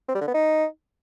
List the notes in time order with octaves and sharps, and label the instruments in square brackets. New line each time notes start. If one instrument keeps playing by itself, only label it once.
[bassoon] C4
G3
D3
B3
D#4